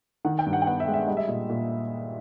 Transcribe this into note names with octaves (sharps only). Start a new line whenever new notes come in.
D#3 F#5
G5
G2
F#5
G5
B3 F#5
E5
G#3
E5
G3 D#5
E5
A#2 D#5
A#2